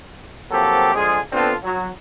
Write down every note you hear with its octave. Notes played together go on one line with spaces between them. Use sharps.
F3 F#3 A#3 C4 G4 A4
D3 F3 G#3 F4 G#4
B3 C4 D4 F4 A4
F#3